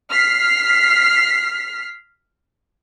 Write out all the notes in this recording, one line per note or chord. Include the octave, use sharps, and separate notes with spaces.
F6 B6 C7